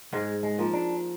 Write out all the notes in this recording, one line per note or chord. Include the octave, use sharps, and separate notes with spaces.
G#2 G#3
G#3
F3 A#3
D4